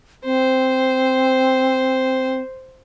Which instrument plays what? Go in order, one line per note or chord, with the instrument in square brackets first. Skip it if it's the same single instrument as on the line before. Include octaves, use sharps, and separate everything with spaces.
[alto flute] C4 [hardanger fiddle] C5